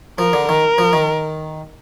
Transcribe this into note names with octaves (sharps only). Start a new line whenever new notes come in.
F3 A#4
D3
D#3 A#4
F3
D#3